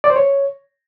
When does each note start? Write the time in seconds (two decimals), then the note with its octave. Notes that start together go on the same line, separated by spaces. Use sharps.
0.04 D5
0.10 C5
0.16 C#5